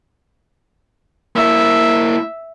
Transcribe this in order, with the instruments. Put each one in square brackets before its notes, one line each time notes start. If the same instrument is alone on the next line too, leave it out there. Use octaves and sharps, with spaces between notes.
[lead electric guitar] A#3 E4 [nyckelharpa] E5